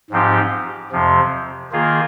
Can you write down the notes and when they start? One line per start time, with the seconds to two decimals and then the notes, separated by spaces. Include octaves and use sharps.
0.10 G#2 F3 C4 D#4 G4
0.92 F2 C3 F3
1.72 D#3 A#3 F4 G#4